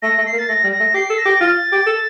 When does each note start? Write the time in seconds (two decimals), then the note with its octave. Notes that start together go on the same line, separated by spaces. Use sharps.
0.02 A3 A#6
0.18 A3
0.26 C7
0.33 A#3
0.38 A6
0.49 A3 A#6
0.64 G3
0.72 A#6
0.80 A3
0.94 G4 C7
1.10 A4
1.18 A#6
1.26 G4
1.40 F4 A6
1.72 G4
1.86 A4